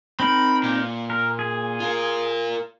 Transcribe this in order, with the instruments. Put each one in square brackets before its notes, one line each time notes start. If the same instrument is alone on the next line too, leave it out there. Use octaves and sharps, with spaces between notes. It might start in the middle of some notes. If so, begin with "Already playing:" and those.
[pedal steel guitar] C4 D#4 A#4 [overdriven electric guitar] B5
[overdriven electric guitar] A#2
[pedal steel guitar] A#4
G#4
[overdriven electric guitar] F4 A#4